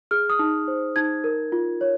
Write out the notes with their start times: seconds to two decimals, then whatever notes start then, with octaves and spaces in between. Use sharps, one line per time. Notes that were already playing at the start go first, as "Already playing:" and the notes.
0.11 G#4 F6
0.30 D#6
0.39 D#4
0.68 C5
0.96 D#4 G#6
1.24 A#4
1.52 F4
1.81 C#5